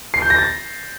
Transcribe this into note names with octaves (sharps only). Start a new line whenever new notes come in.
C7
G6
A#6
A6